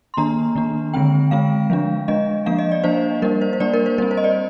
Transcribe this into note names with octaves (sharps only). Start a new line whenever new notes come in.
C6
D#3 A#3 D4 A#5
D#3 A#3 D4
D3 G#3 C4 G5
D3 G#3 C4 F5
F3 G#3 D4
F3 G#3 D4 D#5
F3 A#3 D4 F5
D#5
D5
F3 A#3 D4 C5
G3 A#3 D4 A#4
C5
C5
G3 A#3 D4 D5
A#4
C5
G3 C4 A#4
C5
D#5
D5